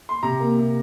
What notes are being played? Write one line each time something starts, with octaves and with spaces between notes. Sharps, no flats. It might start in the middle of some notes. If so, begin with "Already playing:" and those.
C6
C3 A#5
A#3
C3